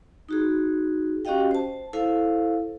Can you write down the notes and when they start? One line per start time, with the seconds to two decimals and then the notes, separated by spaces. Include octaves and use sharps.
0.29 D#4 F#4 G#4
1.25 C#4 F#4 G4 D#5 F5 G5
1.51 C5 A5
1.93 E4 A4 C5 F5